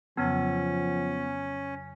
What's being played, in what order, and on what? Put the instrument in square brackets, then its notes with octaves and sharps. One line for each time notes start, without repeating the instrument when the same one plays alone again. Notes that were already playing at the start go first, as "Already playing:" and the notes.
[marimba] F2 C#3 F#3 [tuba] F3 [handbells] B3 [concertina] C#4